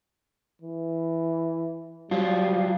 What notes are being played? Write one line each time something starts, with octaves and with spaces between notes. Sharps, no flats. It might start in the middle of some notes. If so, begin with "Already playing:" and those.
E3
F#3 G3 F4